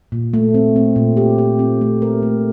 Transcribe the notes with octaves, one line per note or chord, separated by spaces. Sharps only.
A#2
A3
C4
C4
A#2
G4
G4
C4
A3
A#4
A3